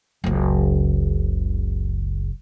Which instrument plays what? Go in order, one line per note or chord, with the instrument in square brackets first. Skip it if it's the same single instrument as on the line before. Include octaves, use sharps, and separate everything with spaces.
[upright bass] F#1 C#2